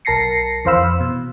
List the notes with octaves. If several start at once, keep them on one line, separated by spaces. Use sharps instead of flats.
B1 A#4 A5 A#6 C7 C#7
F2 E3 C5 F5 B5 E6
B2